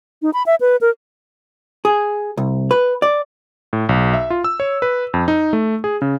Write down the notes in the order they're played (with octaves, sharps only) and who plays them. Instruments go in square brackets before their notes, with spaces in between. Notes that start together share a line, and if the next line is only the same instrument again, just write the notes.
[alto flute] D#4
B5
E5
B4
A#4
[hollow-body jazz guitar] G#4
C2
B4
D5
[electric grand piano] A2
B1
E5
F4
E6
C#5
B4
F2
D#4
A3
G#4
C#3